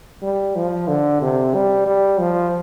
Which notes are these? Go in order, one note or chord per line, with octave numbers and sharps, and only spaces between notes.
G3
F3
D3
C3
G3
G3
F3